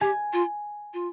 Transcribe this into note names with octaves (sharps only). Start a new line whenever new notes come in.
G4 G#5
F4
F4